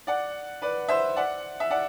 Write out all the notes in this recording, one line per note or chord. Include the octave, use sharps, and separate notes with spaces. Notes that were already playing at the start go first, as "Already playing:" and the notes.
D5 F#5
B4 D5
C5 E5
D5 F#5
E5
D5 F#5